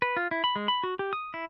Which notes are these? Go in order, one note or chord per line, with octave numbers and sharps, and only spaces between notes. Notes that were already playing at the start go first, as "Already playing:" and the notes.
B4
F4
E4
B5
G#3
B5
F#4
G4
D#6
E4